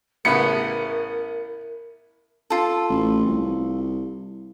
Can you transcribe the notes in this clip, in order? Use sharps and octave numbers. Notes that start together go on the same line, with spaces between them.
A1 C#3 B3 E4 A#4 C#7
F4 A4
A1
C2